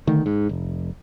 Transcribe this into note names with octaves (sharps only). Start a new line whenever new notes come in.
D3 D#3 A3
G#2
F1